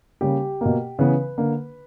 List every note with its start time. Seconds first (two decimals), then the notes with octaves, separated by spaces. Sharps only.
0.21 C#3 G3 A#3 G4
0.61 B2 A#3
0.99 C#3 E3 B3 B4
1.38 D3 A#3